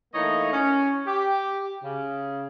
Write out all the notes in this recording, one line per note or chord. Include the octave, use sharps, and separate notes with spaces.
E3 A3 A#3 D#4 C#5 D#5
C#4
G4
C#3